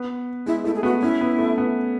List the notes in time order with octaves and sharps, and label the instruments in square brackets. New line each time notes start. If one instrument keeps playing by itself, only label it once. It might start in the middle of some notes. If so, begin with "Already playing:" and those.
Already playing: [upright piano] B3
[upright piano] G#3 [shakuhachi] E4
[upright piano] A3 [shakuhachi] E4
[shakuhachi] G#4
[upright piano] B3 [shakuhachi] F#4
[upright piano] C#4 [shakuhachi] E4
[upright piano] B3
A3
B3